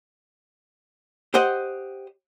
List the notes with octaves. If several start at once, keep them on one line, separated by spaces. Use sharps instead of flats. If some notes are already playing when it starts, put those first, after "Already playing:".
G4 C5 D#5 F#5